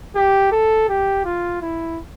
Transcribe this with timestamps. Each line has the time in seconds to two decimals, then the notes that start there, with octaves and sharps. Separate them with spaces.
0.16 G4
0.52 A4
0.89 G4
1.25 F4
1.62 E4